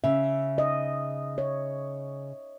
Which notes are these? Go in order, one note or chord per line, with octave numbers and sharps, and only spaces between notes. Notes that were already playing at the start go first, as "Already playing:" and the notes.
C#3 E5
D#5
C#5